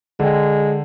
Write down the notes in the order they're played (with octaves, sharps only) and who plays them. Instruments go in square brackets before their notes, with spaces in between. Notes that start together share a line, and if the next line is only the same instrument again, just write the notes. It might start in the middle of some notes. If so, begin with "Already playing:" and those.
[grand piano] D3 G5 [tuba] G#3